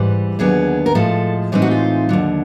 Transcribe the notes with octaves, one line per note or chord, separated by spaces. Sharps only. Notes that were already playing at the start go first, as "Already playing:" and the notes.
Already playing: G#2 E3 G3
D#2 D3 F#3 B3 G#4
A#4
A2 F3 G#3 A4
A2 E3 G#3 C4 D#4
F#4
F4
D#2 D3 F#3